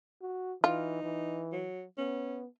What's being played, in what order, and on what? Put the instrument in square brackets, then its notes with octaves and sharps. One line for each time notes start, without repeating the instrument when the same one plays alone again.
[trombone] F#4
[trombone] E3 [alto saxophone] D#4 [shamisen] F4
[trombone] E3
[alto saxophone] F#3
[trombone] B3 [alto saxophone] C#4